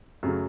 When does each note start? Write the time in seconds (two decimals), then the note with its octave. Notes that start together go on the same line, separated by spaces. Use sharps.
0.23 F#2 C#3 F#3 A3